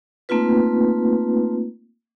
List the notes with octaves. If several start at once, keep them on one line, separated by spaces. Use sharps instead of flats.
A3 A#3 C4 D#4 F4 B4